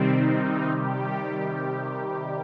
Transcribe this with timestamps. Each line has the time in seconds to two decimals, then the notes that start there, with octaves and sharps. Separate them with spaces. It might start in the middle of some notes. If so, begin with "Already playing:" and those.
Already playing: C3 D#3 G3 C4
0.14 D#4
0.69 C3 D#3 G3 G4